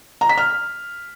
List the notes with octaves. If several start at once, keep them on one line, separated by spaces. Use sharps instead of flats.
A#5
B6
F6